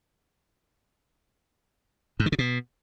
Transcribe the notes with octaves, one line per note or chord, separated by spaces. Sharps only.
G#2
D#3
C#3
B2